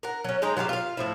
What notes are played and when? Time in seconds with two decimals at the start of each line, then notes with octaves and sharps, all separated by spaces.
0.03 A#4 F#5
0.24 F#3 C#4
0.42 G#3 D#4 G5 A#5
0.57 F#3 F4 G4 F5
0.69 F4 F5
0.97 A2 F3 E4